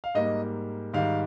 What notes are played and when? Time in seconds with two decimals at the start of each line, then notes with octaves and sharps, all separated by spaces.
0.04 F5
0.15 G#2 G3 A#3 D#5
0.93 G#2 D#3 G3 F5